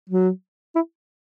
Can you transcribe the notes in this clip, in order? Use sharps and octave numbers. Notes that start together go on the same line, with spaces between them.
F#3
E4